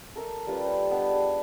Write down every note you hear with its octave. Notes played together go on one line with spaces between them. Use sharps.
A4 A#4 E5
G3 C#4 F4 B4
C5
B3 D4 D#5 G5
G#4